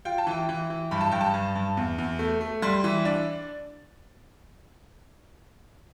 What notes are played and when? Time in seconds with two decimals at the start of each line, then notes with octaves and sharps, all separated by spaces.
0.05 F4 G5
0.18 A5
0.27 E3 G5
0.49 E3
0.70 E3
0.91 G2 B5
1.01 A5
1.11 G2 G5
1.21 A5
1.34 G2
1.55 G2
1.77 E2
1.98 E2
2.19 A3
2.41 A3
2.62 G3 C6
2.84 E3
3.05 D4 D5